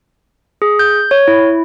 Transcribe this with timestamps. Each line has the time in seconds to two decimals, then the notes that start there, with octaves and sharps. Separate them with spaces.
0.62 G#4
0.79 G6
1.11 C#5
1.28 E4